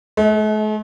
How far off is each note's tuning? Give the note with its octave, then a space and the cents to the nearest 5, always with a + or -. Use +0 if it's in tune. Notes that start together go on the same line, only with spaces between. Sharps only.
A3 -45 D#5 +30